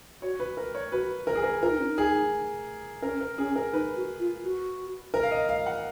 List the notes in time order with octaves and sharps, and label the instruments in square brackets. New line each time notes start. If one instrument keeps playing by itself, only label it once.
[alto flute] F#4 [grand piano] C#5
[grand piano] B4
A#4
C#5
[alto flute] F#4 [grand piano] B4
[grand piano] A#4
G#4
A#4
[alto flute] F4 [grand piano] A#4
[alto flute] D#4
C#4
D#4
[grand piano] G#4
[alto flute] C#4 [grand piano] A#4
[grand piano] A#4
[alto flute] C#4 [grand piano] G#4
[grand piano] A#4
[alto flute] D#4 [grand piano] B4
[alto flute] F#4
F4
F#4
[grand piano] A#4
F5
D#5
F5
F#5